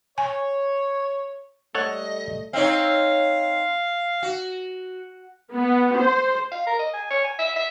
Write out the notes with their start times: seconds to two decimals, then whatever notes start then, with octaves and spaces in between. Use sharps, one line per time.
0.18 C#5 G#5
1.75 G3 A3 A4 C#5 D#5 F#5
2.53 C4 D#4 C#5 F5
4.23 F#4
5.54 B3
5.98 C5
6.52 F5
6.67 A#4
6.79 D#5
6.94 G#5
7.10 C#5
7.24 G#5
7.39 E5
7.56 E5